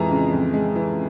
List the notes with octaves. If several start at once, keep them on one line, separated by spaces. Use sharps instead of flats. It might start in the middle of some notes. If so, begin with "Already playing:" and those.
Already playing: F2 E3 G#3 A#5
C#3
F2
G#3
E3